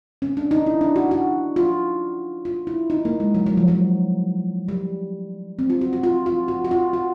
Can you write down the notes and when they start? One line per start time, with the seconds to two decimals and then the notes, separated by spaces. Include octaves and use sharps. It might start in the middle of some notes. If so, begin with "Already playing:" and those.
0.22 C#4
0.37 D4
0.51 D#4
0.66 E4
0.81 D4
0.96 F#4
1.11 F#4
1.56 F4
2.45 F4
2.67 E4
2.90 D#4
3.05 A#3
3.20 G#3
3.35 F#3
3.46 F#3
3.57 F3
3.68 F#3
4.68 G3
5.59 C4
5.70 F4
5.81 F#4
5.93 F#4
6.03 F4
6.26 F4
6.48 F#4
6.64 F#4
6.71 F4
6.93 F#4